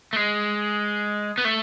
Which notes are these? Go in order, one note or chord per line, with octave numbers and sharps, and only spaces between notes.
A3
G#3
B3
A3